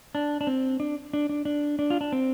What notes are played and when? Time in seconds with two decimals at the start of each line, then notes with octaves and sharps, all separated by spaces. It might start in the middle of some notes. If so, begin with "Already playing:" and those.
0.15 D4
0.41 D4
0.47 C4
0.80 D4
1.13 D4
1.29 D4
1.45 D4
1.79 D4
1.90 F4
2.01 D4
2.12 C4